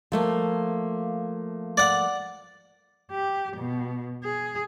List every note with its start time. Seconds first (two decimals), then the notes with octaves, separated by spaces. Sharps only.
0.12 F3 A3 A#3
1.77 D5 F#5
3.11 G4
3.57 B2
4.24 G#4